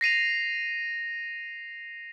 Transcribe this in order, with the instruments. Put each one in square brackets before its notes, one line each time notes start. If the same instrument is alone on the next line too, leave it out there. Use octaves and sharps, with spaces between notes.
[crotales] A#6 C7 D#7 F7